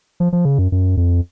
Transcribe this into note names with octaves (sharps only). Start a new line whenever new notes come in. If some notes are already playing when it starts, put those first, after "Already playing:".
F3
F3
C#3
F#2
F#2
F2